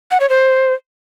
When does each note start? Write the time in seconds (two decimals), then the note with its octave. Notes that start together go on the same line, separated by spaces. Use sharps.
0.11 F#5
0.20 C#5
0.29 C5